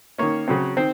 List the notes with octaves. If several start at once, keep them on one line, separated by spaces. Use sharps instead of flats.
D#3 A#3 C#4 C#5
C#3 F#3 C4
D#3 C4 C5